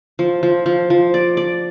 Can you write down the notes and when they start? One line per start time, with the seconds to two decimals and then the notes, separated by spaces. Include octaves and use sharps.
0.19 F3
0.43 F3
0.66 F3
0.90 F3
1.14 D5
1.37 D5